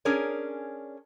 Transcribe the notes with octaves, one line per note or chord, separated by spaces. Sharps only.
C#4 D4 G#4 A#4 C#5